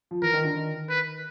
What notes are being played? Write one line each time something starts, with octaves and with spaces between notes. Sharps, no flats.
F3
E3 A#4
D#3
D3
D#3
B4